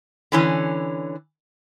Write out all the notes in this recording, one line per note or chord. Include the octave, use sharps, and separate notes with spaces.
D3 E3 C#4